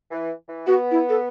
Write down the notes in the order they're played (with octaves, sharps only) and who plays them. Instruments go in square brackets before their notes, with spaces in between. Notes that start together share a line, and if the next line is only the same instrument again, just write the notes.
[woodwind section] E3
E3
[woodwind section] B3 [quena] F#4
[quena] E4
A4